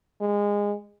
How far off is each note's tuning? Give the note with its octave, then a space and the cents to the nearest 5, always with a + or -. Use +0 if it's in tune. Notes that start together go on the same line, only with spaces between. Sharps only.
G#3 -20